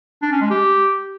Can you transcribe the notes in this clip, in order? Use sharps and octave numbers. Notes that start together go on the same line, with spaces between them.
D4
C#4
G#3
G4